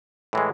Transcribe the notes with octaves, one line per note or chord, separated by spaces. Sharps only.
A2 E3 G#3